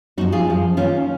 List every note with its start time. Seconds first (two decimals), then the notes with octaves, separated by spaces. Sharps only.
0.17 F#2 D#4 F#4
0.21 F3
0.32 F4 G#4
0.47 F#2 F3
0.77 D#2 D#3 C#4 F4